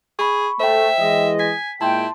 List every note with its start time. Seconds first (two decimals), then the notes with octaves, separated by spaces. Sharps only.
0.19 G#4 B5 C#6
0.60 A3 C5 E5 G5
0.99 E3 G#3 D#5
1.39 G#5 B6
1.81 A#2 G#3 E4 G5 A5 C6